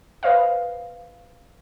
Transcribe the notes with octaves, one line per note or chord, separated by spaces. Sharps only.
B4 C5 D#5 F5